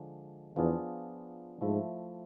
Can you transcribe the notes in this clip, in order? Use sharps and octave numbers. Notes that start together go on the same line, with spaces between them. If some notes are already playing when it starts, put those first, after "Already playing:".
Already playing: D3 F3 G#3 D4
E2 F3 B3 D4 F4 G#4
G#2 F3 A3 E4